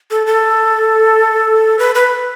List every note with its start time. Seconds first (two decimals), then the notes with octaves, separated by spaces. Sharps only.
0.11 A4
0.26 A4
1.79 B4
1.95 B4